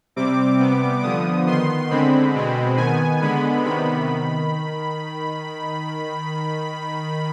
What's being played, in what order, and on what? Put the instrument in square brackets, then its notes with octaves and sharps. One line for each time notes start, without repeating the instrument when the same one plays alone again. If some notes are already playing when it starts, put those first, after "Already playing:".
[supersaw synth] C3 G3 C4 D6
C3 G3 B3
D3 F3 B3 D#6
D#3 B3 C6
D3 G#3 C4 B5
B2 G#3 C4
D#3 B3 G#5
D3 G#3 B3 B5
C3 D#3 B3 B5
D#3